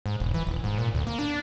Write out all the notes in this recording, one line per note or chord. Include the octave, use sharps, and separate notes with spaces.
G#2
E1
E3
D#1
G#2
A#2
D2
A#3
D4